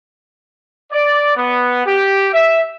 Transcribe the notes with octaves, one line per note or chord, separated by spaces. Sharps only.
D5
B3
G4
E5